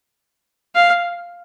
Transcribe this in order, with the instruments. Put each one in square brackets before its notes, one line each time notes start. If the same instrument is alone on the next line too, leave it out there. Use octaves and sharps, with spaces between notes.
[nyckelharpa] F5